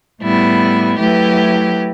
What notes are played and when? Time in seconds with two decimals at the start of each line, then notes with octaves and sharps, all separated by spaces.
0.22 A2 G3 B3 E4
0.98 F#3 A3 E4 G4 B4